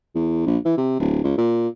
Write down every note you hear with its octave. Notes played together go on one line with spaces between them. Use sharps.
E2
A#1
E3
C3
D1
C#2
A#2